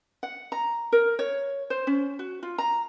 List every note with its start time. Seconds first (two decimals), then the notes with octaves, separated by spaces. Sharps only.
0.23 F#5
0.52 A#5
0.92 A#4
1.19 C#5
1.70 C5
1.87 C#4
2.19 F#4
2.43 F4
2.58 A#5